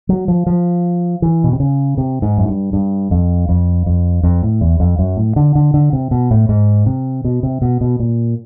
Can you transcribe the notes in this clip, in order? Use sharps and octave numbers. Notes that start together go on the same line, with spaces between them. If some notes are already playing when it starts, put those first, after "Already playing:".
F#3
F3
F3
E3
B2
C3
C#3
C3
G#2
F#2
G2
G2
F2
F2
F2
F2
A2
E2
F2
F#2
A2
D3
D3
D3
C3
B2
A2
G#2
C3
B2
C3
B2
B2
A#2